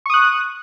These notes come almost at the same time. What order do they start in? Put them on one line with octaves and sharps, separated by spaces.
C#6 D#6 F#6